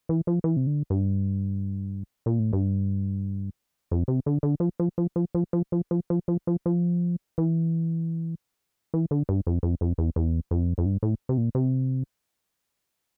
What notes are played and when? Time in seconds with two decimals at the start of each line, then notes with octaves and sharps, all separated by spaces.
0.09 E3
0.27 F3
0.44 E3
0.57 C3
0.67 D3
0.90 G2
2.26 A#2
2.39 A2
2.53 G2
3.91 F2
4.08 C3
4.26 D3
4.43 D3
4.60 F3
4.80 F3
4.98 F3
5.16 F3
5.35 F3
5.53 F3
5.72 F3
5.91 F3
6.10 F3
6.28 F3
6.47 F3
6.66 F3
7.38 E3
8.94 E3
9.11 D3
9.29 G2
9.47 F2
9.63 F2
9.81 F2
9.98 E2
10.16 E2
10.51 F2
10.78 F2
10.86 G2
11.03 A2
11.29 C3
11.37 A#2
11.55 C3